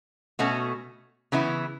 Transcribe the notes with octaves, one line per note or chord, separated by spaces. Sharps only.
B2 A3 C#4 F#4
C#3 E3 B3 E4